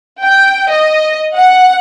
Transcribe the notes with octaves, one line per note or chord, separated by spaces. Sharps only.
G5
D#5
F#5